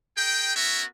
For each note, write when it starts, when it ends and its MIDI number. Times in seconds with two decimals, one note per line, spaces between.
0.17 0.56 68
0.17 0.56 70
0.17 0.56 79
0.56 0.83 59
0.56 0.83 61
0.56 0.83 66
0.56 0.83 70
0.56 0.83 76